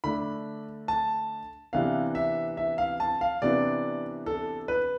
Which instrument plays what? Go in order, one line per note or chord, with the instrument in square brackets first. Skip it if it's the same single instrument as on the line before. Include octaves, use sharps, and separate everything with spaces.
[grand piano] D3 A3 D4 B5
A5
C3 E3 B3 D4 F5
E5
E5
F5
A5
F5
C3 E3 B3 D4 D5
A4
B4